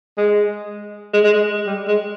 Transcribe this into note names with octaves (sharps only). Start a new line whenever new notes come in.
G#3
G#3
G#3
G#3
G3
G#3